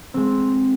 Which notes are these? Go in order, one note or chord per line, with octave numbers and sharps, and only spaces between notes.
G#3 C4